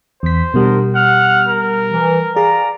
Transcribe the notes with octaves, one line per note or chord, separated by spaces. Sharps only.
E2 C5 B6
B2 G3 B3 D4 A#4
F#5 F6
A#4
E3
G#4 D5 F5 A#5